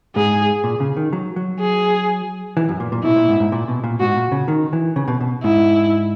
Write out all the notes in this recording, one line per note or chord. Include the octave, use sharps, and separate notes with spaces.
G#2 G#4
A#2
C#3
D#3
F#3
F#3
G#4
E3
F#2
A#2
A#2
B2 E4
A#2
G#2
G#2
A#2
B2
A#2
G#2 F#4
A#2
C#3
D#3
E3
C#3
B2
B2
G#2 E4